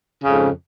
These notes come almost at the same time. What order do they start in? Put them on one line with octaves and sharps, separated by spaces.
C#3 F2 G#2